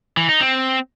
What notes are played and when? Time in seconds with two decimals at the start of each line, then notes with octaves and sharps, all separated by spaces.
0.17 E3
0.29 D#4
0.41 C4